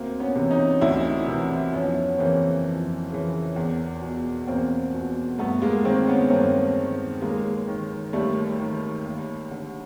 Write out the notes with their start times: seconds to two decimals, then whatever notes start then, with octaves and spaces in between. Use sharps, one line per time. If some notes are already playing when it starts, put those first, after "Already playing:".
Already playing: D2 A#3 C4
0.20 B3 C#4
0.35 C3 E3
0.51 C#4 D#4
0.81 D2 D4 E4
1.28 C3 E3
1.72 F2 B3 C#4
2.18 C#3 E3 A#3 C4
2.65 F2
3.10 C#3 E3
3.56 E2
4.02 B2
4.47 E2 A#3 C4
4.94 B2
5.38 G2 A3 B3
5.62 G#3 A#3
5.84 D#3 A#3 C4
6.08 B3 C#4
6.30 G2 A#3 C4
6.77 D#3
7.22 D#2 G#3 A#3
7.68 D#3
8.13 D#2 G3 A3
8.60 D#3
9.06 D#2
9.51 D3